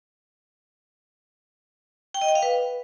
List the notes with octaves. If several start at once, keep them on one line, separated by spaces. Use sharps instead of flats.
G5
D#5
G5
F5
B4